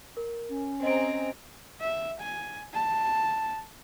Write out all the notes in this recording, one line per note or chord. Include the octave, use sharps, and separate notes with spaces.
A#4
C#4
C4 G#4 D#5 A#5 D7
E5
G#5
A5